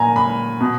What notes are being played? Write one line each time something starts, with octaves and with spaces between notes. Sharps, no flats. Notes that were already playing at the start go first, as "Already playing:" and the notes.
Already playing: A#2 G#5 A#5
B5
B2